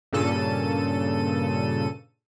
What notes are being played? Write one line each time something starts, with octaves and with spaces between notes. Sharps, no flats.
G2 A#2 C#3 A4 D#7